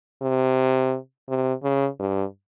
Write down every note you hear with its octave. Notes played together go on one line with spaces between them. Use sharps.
C3
C3
C#3
G2